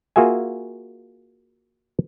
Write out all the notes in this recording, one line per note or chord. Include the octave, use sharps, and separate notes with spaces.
A#3 F4 F#4 G#4 E5 G#5